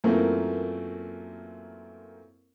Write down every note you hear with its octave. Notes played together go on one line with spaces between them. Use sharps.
F#2 A#2 E3 A3 A#3 C4